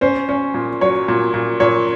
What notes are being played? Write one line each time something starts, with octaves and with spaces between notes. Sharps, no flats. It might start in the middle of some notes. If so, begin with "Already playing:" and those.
C#4 C5
C#4
A#2
F#3 C#5
A#2
A#2
A#2 C#5